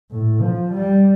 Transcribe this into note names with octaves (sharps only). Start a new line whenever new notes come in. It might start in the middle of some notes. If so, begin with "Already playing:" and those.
A2
F3
G3